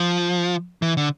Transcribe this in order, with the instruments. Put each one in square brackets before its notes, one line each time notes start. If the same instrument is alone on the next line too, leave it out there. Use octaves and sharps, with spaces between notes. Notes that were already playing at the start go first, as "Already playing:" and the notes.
Already playing: [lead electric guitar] F3
E3
D3